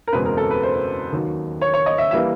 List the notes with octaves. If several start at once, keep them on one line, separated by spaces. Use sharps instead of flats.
A#4
F#1 E2 B2 G#3 C4 B4
A#4
A4
B4
C5
D#2 D#3 F#3
C#5
C#5
D#5
E5
E3 G3 A#3 E5